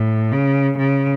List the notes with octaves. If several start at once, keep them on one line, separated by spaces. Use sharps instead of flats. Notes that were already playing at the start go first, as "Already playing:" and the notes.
Already playing: A2
C#3
C#3